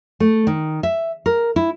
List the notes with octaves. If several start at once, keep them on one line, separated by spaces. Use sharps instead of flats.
A3
D#3
E5
A#4
E4